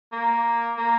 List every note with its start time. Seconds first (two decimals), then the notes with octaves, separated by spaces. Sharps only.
0.12 A#3
0.77 A#3